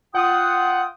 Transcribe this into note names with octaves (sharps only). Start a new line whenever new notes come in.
F4 F#5 G5 D#6